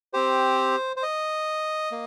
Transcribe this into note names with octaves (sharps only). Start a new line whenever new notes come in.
C4 G4 C5
C5
D#5
A#3